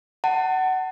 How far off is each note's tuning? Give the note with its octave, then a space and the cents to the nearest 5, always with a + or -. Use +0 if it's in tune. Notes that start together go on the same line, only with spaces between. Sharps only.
F#5 +20 A5 +25